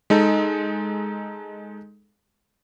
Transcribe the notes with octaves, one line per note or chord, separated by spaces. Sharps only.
G#3 D#4 A4